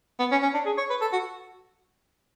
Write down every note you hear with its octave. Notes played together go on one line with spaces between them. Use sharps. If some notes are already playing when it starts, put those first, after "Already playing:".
B3
C#4
C#4
D4
G#4
C#5
B4
A4
F#4